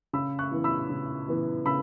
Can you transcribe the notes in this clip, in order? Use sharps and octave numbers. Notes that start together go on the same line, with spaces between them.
C#3 B5 E6
C#6 F#6
E3 B3
B5 E6
C#3
E3 B3
C#3 B5 E6